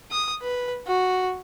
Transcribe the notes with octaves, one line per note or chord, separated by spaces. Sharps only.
D#6
B4
F#4